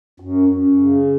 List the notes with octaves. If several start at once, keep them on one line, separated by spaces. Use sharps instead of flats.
F#2
F#2
C#3